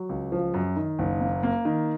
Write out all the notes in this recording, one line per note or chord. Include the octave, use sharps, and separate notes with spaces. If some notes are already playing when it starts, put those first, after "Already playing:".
Already playing: F#3
C#2
F3
F#2
D#3
F#1
A#3
A#3
D#3